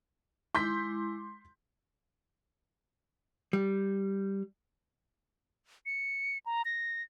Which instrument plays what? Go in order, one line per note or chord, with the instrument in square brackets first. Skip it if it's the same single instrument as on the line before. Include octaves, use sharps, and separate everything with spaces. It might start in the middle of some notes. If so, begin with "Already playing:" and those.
[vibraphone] G#3 E4 D6 [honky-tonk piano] C6 G6 B6
[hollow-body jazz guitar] G3
[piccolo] C#7
A#5
A#6